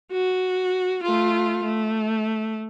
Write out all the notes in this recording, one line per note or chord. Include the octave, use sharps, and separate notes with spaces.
F#4
A3 F4
A3